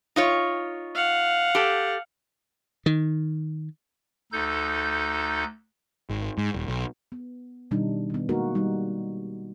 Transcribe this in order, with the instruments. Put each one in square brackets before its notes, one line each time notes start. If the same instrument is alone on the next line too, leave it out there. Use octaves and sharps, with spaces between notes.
[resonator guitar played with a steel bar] D#4 F4 C#5
[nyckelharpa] F5 F#5
[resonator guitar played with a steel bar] G4 A4
[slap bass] D#3
[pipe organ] D2 D#4 A4 G6
[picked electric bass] G#1
G#2
D#1
B1
[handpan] B3
B2 D#3 G3 D4 D#4
D#3 B3
G#3 A#3 D#4 F#4 A#4
G3 D#4